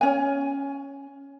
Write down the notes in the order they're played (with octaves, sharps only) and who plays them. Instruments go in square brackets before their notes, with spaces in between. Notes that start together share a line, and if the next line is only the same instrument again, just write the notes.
[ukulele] C#4 G#5